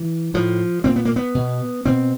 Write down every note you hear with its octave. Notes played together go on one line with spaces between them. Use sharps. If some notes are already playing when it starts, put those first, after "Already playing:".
Already playing: E3
A2 F3
A#2 C4
B3
A#3
B3
B2
B2 C4